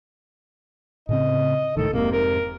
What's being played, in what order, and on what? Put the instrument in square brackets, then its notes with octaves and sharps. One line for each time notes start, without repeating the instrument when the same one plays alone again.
[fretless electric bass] A2 C#3 C4 [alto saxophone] D#5
[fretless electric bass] C#2 A2 D#3 [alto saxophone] A4
[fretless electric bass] F1 G#2 C3 [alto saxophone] A#3
[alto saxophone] A#4